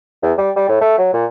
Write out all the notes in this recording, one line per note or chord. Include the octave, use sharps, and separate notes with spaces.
E2
G3
G3
A2
A3
F#3
A#2